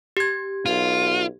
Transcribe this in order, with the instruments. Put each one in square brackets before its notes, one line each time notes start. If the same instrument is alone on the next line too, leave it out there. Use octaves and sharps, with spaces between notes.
[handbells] G4 G#6
[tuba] B1 [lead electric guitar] F4